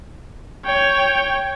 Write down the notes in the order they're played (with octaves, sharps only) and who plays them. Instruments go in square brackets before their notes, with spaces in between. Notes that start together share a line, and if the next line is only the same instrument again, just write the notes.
[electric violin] C#5 G5